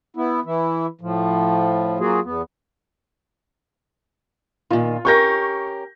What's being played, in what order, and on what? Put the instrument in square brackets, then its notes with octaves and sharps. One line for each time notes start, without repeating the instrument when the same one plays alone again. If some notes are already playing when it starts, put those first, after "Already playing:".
[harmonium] B3 E4
E3 E4
A2 F3
F#3 A#3 F4 F#4 G#4
E2 B3
[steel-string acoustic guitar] A#2 D#3 [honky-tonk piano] F4
[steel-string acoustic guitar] C#4 G4 A#4 [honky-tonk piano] C#6 G6 A#6